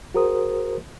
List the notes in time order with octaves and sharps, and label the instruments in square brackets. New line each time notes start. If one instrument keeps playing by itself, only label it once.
[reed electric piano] F#4 G#4 A#4 C5 D#6